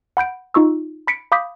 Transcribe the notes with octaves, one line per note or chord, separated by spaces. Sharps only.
F#5 B5 G6 D7
D#4 F4 C#6 E6
B5 B6 C#7 D7
F5 B5 D6 D#6 G6 B6